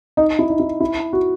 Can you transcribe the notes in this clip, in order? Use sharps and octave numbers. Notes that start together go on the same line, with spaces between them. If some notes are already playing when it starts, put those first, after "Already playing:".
D#4
E4
D#4
E4
E4
F#4